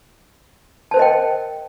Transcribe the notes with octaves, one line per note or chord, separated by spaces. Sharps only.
A#4 C5 D#5 G5 A5